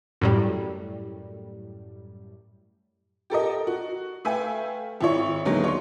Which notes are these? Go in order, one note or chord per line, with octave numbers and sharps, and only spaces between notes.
F#2 A2 G3
G4 A4 A#4 D#5
F#4
A3 B4 E5 F5 G5 G#5
G#1 E4 C#5
D2 D#3 F#3 G#3 A#3 B3
C#5 C6